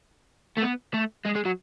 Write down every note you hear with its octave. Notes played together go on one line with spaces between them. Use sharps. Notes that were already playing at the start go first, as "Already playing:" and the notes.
A3
B3
A3
G#3
G#3
F#3